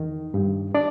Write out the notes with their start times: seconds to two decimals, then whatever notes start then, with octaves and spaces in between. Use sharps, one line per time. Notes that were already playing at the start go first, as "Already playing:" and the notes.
Already playing: E2 D#3
0.34 G2
0.75 D4 D5